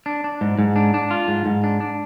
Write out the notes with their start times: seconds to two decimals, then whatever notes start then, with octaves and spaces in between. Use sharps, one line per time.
0.06 D4
0.24 D4
0.41 G#2
0.59 G#2
0.76 D4
0.94 D4
1.11 F4
1.28 G#2
1.46 G#2
1.64 D4
1.81 D4